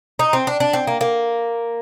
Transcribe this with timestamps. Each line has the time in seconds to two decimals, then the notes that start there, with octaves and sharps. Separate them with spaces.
0.19 D#4
0.33 C4
0.47 D4
0.60 D4
0.73 C4
0.87 A#3
1.01 A#3